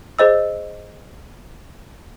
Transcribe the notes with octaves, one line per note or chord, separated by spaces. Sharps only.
G#4 C5 D#5 E6